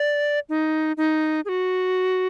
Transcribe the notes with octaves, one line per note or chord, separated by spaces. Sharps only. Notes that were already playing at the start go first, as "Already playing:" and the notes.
Already playing: D5
D#4
D#4
G#4
F#4